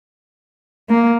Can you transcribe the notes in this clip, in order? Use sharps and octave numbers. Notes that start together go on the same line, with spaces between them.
A#3